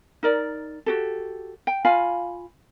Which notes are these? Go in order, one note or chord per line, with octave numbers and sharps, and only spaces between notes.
D#4 A#4 D5
F#4 G4 A4
G5
F4 F5 G#5 B5